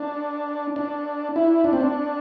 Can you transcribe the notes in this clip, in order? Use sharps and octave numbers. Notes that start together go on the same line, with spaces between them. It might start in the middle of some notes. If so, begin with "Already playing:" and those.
Already playing: D4
D4
E4
D4
C4
D4